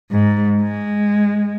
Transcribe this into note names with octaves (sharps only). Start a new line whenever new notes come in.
G#2
G#3